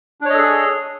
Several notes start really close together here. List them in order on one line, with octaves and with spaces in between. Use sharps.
D4 C#5 D#5 A4 G#4